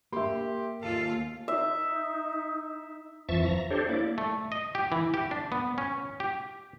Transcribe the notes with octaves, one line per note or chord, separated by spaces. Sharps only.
A#3 G4 E5 C6
D#2 F4 A4
D#4 E5
F2 E3 F3 E5 A5 C#6
A#5
D4 G4 A4 C5 C#5
A#3 E4 D5
A3
D#5
G4
E3
G4
D4
B3
C#4
G4